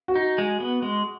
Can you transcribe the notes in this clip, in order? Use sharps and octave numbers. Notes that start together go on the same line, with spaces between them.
F#4
D#4
G#3
B3
G#3